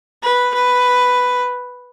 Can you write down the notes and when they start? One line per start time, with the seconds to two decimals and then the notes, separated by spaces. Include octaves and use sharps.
0.23 B4
0.54 B4